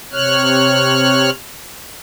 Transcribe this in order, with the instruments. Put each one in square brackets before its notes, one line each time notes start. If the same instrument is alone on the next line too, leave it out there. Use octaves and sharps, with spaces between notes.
[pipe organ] C3 C#5 F6 F#6